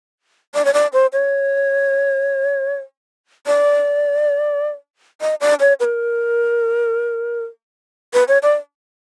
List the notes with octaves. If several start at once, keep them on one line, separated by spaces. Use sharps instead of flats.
D5
C#5
D5
C5
C#5
D5
D#5
D5
C#5
B4
A#4
B4
C#5
D5